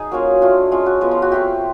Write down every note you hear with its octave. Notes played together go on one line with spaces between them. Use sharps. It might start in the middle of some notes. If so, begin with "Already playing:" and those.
Already playing: D#4 G#4
F#3 A#3 C#4 F4
A3 D4 F4
G#3 C#4 F4
F#4
F3 G#3 B3
F4
F#4
A3 C4 F4 G4